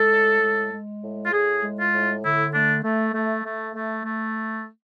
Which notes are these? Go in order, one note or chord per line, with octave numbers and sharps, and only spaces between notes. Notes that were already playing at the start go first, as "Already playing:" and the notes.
Already playing: G#3 A4
A2
G#3
G#3
A2
F4
A2 G#4
G#3
F4
A2
D3 E4
A3 D4
A3
A3
A3
A3
A3